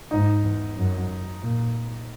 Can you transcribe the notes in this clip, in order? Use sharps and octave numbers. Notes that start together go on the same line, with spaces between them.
G#2 D#4
E2
F#2
A#2